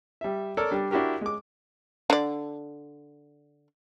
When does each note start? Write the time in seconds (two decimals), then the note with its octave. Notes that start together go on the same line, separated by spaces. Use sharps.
0.21 G3 E5
0.57 A4 A#4 C#5 D5
0.71 G3 D4
0.91 D4 E4 F#4 G4 A#4
1.21 G#3 D6
2.10 D3 D5